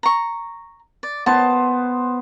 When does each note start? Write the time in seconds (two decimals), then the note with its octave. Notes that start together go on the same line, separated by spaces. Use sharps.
0.03 A#5 C#6
1.03 D5
1.26 B3 C5 A5